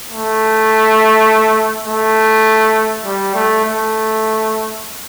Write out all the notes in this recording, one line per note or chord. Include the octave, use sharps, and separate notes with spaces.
A3
A3
G3
A3
A3